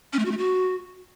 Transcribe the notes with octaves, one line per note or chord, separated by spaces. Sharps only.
C#4
A3
F#4
A3
F#4